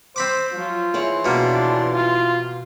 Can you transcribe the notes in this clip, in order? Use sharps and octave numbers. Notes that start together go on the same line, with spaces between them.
C4 C5 B5 D6
F3 F#3 F4
E3 F3 E4 G#4 C#5 C6
B2 A#3 D4
F4